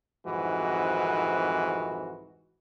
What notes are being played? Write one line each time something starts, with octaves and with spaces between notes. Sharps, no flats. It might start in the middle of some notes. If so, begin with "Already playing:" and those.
C2 F2 G#2 D#3 E3 F#4